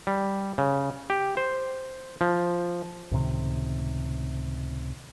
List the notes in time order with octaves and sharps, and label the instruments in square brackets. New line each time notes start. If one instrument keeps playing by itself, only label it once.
[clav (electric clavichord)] G3
C#3
G4
C5
F3
[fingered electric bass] C#2 A2 C3 D#3